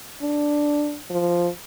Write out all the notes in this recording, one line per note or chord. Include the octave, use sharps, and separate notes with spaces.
D4
F3